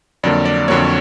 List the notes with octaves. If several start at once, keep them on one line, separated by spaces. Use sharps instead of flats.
F2 D3 F#3 A#3 D5
D5
F2 D3 F#3 A#3 C#5